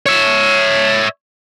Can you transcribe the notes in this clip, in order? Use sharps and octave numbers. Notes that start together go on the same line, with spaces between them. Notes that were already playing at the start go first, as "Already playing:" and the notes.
C#5 E5